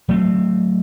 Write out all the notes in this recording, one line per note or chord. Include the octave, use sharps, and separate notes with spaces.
F#3 A3 B3 C4